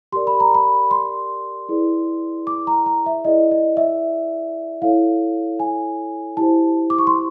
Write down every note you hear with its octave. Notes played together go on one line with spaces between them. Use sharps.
G4 A#4 D5 C6
B5
A#5
B5
C6
E4 G#4 B4 D5
D6
A#5
A#5
E5
E4 G#4 B4 D5 D#5
D#5
E5
E4 A4 C#5 F5
G#5
E4 G4 C5 A5
D6
C#6
C6